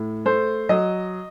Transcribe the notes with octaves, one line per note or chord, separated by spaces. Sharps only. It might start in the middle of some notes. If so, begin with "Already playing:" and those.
Already playing: A2
A3 C5
F#3 D#5